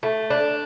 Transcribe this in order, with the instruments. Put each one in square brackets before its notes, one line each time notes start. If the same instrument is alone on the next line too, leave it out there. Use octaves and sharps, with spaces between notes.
[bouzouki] A3
D4